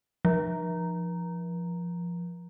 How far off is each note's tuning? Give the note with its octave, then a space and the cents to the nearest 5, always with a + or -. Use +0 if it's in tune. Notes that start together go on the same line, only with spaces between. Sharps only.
F3 -10